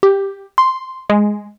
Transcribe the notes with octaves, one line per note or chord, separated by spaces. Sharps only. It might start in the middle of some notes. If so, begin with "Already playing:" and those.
G4
C6
G#3